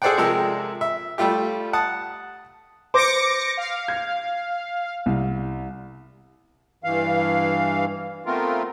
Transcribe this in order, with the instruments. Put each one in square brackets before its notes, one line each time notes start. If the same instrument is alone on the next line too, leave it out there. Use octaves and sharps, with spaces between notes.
[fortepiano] G#4 A4 C5 D5 F#5 G5
C3 F3 G#3 C4 A4 A#4
E5
G3 A3 F4 G4
F#5 A5 D#6
[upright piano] C5 [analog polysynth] D6 A#6 C#7
[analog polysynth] F5
[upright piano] G#6
C2
[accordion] G2 E3 F5
A3 B3 C4 F4 A#4